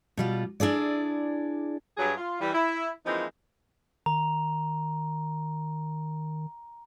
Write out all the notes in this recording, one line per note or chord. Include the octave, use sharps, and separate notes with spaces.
B2 G3 F4
D4 E4 G#4 D5
G2 F#3 G#4
F4
E3 G3
E4
E3 F3 G#3 A#3 C4 D#4
D#3 A#5